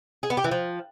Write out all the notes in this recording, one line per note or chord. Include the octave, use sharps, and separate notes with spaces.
G#4
B3
G4
E3
F3